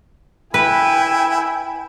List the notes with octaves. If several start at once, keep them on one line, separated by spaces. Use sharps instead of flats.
E4 B4 G5 G#5